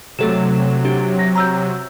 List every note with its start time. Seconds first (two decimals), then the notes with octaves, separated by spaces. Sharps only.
0.19 C3 F#3 A3 A4 E7
0.85 D4 G4
1.19 A#6
1.35 A#5 E6 G6